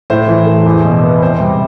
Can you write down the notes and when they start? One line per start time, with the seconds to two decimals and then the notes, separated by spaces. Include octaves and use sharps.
0.10 A2 C5
0.28 E3
0.46 A3
0.66 E2
0.85 B2
1.03 B3
1.22 C3 C5
1.40 G3